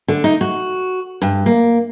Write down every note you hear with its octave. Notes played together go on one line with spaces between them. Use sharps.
D3
D#4
F#4
G2
A#3